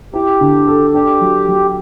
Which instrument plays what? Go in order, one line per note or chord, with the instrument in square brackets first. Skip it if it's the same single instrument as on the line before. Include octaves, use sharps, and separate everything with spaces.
[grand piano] E4 [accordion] G4
[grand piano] D3
A4
[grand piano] D4 [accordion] G4
[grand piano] F#3
F#3